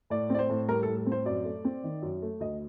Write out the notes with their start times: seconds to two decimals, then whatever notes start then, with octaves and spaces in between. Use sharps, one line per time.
0.10 A2 D5
0.30 C4 D5
0.39 C5
0.50 A2
0.68 G3 A#4
0.83 A2 A4
0.97 A4
1.06 C4
1.12 C5
1.25 F#2 D5
1.45 A3
1.65 C4
1.84 D#3
2.02 F#2
2.22 A3
2.40 D2 D#5